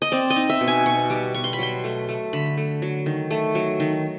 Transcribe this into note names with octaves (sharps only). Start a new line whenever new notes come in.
D#5
C4 D5
D#5
D#4
E5
B2
G#5
B2 C#6
G3 D6
B2 C#6
C6
B5
F#3 C6
A3
A3
D3 B5
A3
F#3
D#3
A3
F#3
D#3